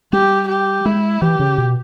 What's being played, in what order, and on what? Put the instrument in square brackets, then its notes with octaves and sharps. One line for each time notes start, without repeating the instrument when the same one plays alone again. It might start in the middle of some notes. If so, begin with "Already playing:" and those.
[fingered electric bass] G3 [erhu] G4
[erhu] G4
[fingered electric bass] G#3 [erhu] E4
[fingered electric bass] E3 [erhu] G4
[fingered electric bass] C#3
B2